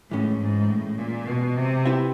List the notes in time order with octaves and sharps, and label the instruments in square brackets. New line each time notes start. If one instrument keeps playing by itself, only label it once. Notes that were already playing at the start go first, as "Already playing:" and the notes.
[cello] A2 [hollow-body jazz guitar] E3 G#3 C#4
[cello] G#2
A2
A#2
B2
C3
[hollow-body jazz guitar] C4 E4 G4 B4 E5